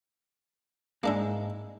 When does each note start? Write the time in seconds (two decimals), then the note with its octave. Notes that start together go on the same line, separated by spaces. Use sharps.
1.04 G#2 G#3 A#3 D4 E4